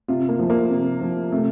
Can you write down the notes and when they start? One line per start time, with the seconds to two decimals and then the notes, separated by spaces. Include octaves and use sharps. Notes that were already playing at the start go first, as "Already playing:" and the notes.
0.08 C3 F4
0.29 A#3
0.39 F3
0.50 A#3
0.70 C3
1.01 F3
1.32 C3 A3